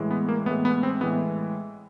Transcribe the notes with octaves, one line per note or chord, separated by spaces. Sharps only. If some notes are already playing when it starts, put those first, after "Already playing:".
Already playing: A2 E3 G#3
B3
A#3
A2 E3 G#3 B3
B3
C4
A2 E3 G#3 B3